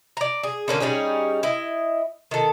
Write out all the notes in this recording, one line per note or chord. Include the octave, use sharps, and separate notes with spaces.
D5 A#5
G#4
D3 A#3 C#4 D4
G3 C#4 D#4 G#4
E4 D#5
D#3 A4